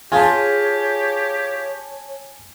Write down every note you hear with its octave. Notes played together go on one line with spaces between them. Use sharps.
F4 G4 G#4 C#5 G#5 A5